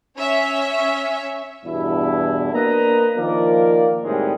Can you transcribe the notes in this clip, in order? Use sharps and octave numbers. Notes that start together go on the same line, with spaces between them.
C#4 C#5 E5
E2 G2 B2 E4
A#3 D4 A#4 B4 D#5 A#5
D#3 F3 A#3 A#4 D5
A2 C3 D#3 G3 G#3